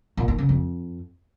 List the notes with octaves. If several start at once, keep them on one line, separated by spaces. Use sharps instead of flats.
A#2
D#3
C#3
F2